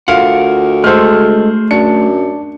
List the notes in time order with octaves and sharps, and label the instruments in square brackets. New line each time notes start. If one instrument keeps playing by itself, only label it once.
[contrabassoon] D2 [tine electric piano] F4 [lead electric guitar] A#4 F#5 [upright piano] F5
[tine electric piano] G#3 A4 [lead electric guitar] A3 G#4 [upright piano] C5 F6
[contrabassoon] F#2 [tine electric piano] D4 [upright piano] C#7